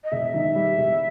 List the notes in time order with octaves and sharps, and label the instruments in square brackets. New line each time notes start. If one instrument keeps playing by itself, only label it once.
[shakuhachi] D#5
[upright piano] E1 [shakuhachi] E5
[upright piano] D#3
G3
E1